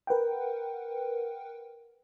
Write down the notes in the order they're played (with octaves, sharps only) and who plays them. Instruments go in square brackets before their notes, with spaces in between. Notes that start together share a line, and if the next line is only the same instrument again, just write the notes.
[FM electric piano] A#4 B4 F#5 G5